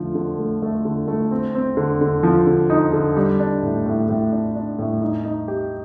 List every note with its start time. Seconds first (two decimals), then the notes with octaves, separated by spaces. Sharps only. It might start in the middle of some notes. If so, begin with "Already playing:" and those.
Already playing: D3 F3 A3
0.15 D3
0.39 A3
0.62 A3
0.85 D3
1.08 A3
1.31 C4
1.55 C4
1.77 D3
2.01 D3
2.23 F3
2.47 D3
2.70 D#4
2.93 D3
3.16 G3
3.39 D4
3.62 A2
3.86 A2
4.08 A2
4.32 D4
4.55 D4
4.79 A2
5.02 D#4
5.25 D#4
5.48 G4